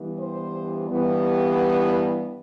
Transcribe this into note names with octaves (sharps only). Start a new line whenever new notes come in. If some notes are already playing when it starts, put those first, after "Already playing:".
Already playing: G2 E3 G3 B3
C5
G2 E3 G3 B3